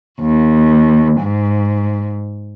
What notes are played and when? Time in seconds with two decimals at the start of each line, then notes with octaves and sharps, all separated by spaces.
0.19 D#2
1.19 G#2